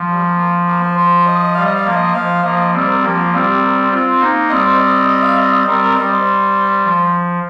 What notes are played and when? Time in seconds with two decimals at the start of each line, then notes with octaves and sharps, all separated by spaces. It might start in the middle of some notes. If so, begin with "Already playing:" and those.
Already playing: F3
0.09 G3
0.24 A#3
0.38 A#3
0.67 A#3
0.82 C5
0.97 C5
1.26 D#5
1.55 G3 F5
1.66 D#5
1.76 F5
1.85 F3 A#3
1.95 D#5
2.15 F3 F5
2.44 F3 A#3 D#5
2.73 G3 C4 C5
2.88 A#4
3.02 F3 A#3 G4
3.17 F4
3.32 G3 C4 F4
3.47 G4
3.61 A#4
3.77 C5
3.91 C4 F4
4.20 A#3 D#4
4.49 G3 C4 D#5
4.65 C5
4.78 D#5
4.94 D#5
5.08 D#5
5.23 F5
5.38 D#5
5.53 D#5
5.67 G3 C4 A#4
5.82 A#4
5.97 G3 D#5
6.12 C5
6.84 F3